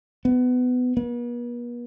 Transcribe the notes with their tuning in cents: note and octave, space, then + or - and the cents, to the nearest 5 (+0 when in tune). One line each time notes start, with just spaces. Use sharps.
B3 +20
B3 -45